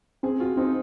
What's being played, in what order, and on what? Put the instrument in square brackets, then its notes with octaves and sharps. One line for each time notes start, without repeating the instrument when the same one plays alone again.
[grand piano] C4 [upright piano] G#4
[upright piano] F4 [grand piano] F#4
[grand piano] C4 [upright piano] D#4